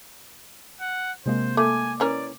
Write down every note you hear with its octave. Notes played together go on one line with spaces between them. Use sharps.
F#5
C3 G#3 A#3 C5
A3 A#3 G#5 D6
E3 C#4 A#4 D5